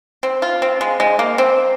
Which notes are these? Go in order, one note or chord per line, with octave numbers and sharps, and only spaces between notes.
C4
F4
C4
G#3
G#3
A#3
C4